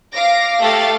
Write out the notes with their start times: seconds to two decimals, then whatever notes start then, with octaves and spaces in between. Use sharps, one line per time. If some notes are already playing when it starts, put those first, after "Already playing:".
0.15 F5 D6 A#6
0.60 A3 G4 A4 F5 A6